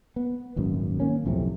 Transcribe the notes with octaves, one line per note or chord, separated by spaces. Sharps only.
B3
D#1 G#1 F#2
D#3 A#3 C#4
B1 F2 A2 C3